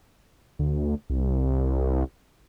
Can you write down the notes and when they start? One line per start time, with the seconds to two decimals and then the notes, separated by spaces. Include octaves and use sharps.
0.59 D2
1.10 C2